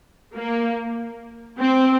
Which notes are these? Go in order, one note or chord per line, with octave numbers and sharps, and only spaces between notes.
A#3
C4